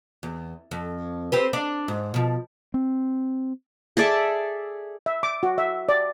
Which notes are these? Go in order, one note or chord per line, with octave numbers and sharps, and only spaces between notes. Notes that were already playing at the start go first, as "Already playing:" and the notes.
E2
F2
C4 G4 B4
D4
G#2
B2 F3
C4
G#4 A4 D5 E5
E5
D6
F#4
E5
D5